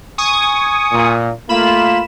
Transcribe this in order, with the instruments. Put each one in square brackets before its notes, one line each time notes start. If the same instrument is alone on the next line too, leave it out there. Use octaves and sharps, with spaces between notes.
[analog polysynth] G#5 C#6 D#6
[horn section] A#2
[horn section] A3 A#3 F4 [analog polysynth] B5 E7